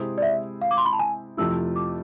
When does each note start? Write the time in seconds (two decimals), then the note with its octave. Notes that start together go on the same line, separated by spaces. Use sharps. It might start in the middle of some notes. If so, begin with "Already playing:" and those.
Already playing: C3 G#3 C4 E4 G#4
0.18 D5
0.22 E5
0.62 F5
0.71 D6
0.78 C6
0.85 B5
0.93 A5
0.99 G#5
1.37 F2 C3 F3 A3 E4 E6
1.76 D6